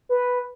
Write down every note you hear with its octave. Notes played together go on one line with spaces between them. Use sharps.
B4